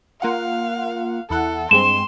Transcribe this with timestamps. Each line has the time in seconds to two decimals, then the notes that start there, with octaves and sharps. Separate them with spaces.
0.22 A#3 F4 F5 F#5
1.30 E2 E4 A4 F#5
1.71 G2 G#3 C4 C6 E7